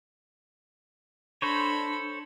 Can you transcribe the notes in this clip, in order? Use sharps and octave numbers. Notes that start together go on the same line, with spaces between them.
D4 A4 C5 C#5 B5 C#6 A#6